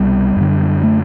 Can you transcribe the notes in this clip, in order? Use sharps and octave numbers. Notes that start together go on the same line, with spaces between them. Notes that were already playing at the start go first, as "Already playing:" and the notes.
Already playing: C2 B2 G3
F#2 D3
A3